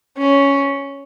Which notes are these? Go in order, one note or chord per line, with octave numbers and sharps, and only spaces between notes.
C#4